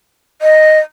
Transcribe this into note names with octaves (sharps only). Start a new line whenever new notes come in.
D#5